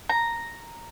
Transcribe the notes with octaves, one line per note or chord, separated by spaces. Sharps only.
A#5